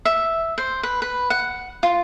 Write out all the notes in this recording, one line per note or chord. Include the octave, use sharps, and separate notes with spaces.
E5
C5
B4
B4
F#5
F4